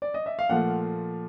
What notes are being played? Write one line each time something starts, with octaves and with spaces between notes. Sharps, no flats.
D5
D#5
E5
F5
A#2 F3 A3 F#5